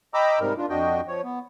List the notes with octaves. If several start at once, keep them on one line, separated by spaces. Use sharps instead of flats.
D#5 G5 A#5 B5 D6 E6
G#2 C3 G3 A#4
D4 F4
F2 D4 F#4 D#5 G5
F3 C#5
B3